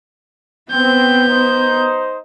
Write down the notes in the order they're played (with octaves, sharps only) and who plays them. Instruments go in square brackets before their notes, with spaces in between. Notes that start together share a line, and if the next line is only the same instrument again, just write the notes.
[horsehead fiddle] B3 [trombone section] C4 [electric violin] G6
[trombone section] D#4 C5